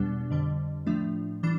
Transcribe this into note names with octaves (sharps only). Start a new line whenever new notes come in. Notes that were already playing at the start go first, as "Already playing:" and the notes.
Already playing: E2 B2 G3 B3 D4
F2 D3 G3
A2 F3 A3 D4
E3 G3 D4